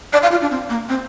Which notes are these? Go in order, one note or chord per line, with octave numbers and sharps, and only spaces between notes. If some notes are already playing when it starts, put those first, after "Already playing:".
D5
F5
F4
D4
C4
A#3
C4